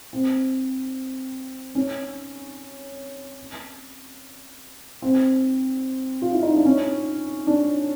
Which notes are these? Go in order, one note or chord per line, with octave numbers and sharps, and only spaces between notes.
C4
C#4
C4
F4
E4
D#4
D4
C#4
D4